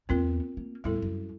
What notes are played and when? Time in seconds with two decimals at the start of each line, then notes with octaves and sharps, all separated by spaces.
0.09 E2 B3 C4 F4 A#4
0.57 A#3
0.84 E2 A2 G3 E4 A4
1.02 F#2